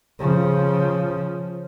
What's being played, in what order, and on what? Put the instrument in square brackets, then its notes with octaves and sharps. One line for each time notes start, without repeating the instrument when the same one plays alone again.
[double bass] C#3 F3